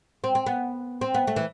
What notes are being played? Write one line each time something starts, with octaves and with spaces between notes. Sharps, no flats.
C4
C4
B3
C4
B3
A3
E3